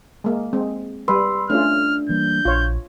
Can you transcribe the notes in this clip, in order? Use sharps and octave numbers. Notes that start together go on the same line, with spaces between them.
G#3 A#3
G#3 C4
G3 B4 B5 C6 E6
A3 C#4 D4 F4 F6
E3 G3 A#3 G6
A#1 F4 C#5